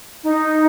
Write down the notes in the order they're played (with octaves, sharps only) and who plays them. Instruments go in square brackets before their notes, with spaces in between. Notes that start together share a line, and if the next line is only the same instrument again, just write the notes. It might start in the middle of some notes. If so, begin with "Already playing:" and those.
[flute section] D#4